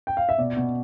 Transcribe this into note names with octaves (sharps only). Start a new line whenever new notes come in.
G5
F5
E5
B2 D5
B2